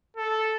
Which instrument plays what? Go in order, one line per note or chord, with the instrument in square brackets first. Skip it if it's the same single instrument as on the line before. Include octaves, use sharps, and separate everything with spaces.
[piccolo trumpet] A4